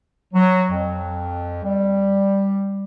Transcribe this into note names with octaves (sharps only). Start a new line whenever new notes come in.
F#3
F2
G3